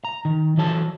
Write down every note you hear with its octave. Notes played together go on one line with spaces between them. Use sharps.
A#5
D#3
E3 F#3 A4 A5